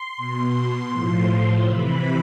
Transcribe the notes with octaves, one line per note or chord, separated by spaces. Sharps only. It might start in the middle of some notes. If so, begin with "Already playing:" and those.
Already playing: C6
B2
C6
A2 F3 C6
C6
C3 E3 B5